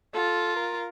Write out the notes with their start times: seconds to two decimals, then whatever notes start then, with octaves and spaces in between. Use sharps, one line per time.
0.14 F4 A4
0.56 A#4